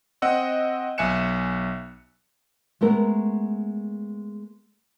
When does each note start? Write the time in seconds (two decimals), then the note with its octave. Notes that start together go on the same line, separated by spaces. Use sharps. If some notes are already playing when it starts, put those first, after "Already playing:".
0.22 C4 D#5 F#5 E6
0.98 B1 E5 G#5 F#6 C#7 E7
2.81 G#3 A3 B3 A#4